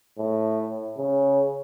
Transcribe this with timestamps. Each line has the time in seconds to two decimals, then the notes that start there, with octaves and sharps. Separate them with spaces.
0.18 A2
0.98 C#3